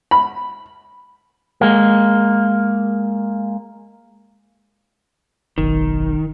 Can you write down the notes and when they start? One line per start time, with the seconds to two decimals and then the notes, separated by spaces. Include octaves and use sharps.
0.11 B5
1.61 G#3 A#3
5.58 F#1 B1 D#3